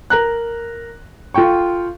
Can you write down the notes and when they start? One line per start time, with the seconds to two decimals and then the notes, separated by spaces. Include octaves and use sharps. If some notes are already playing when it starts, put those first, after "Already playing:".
0.10 A#4 A#5 F#6
1.34 F4 A4 G5 C#6